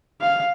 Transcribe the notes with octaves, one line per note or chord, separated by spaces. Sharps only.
F5